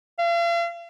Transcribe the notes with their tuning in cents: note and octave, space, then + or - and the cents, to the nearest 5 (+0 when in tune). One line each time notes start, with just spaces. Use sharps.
F5 -40